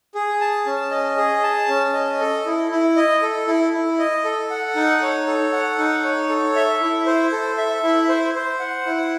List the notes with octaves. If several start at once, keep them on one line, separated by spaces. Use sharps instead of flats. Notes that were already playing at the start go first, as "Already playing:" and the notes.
G#4
A5
C#4
D#5
G#4
A5
C#4
D#5
A4
E4
E4
D#5
A4
E4
E4
D#5
A4
F#5
D#4
C#5
A4
F#5
D#4
C#5
A4
E5
E4
C5
A4
E5
E4
C5
C5
F#5
E4